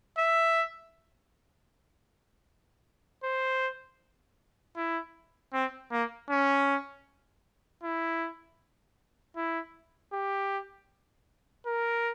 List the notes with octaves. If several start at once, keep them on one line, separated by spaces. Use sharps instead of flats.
E5
C5
E4
C4
A#3
C#4
E4
E4
G4
A#4